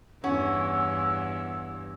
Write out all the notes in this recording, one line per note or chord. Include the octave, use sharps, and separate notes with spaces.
E2 G2 C#4 F#5 E6